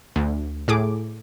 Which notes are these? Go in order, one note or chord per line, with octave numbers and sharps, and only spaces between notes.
D2
A2 G#4 D6